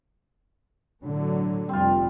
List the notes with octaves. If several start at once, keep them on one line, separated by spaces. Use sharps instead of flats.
A2 D3 F#3
F1 G3 C4 F4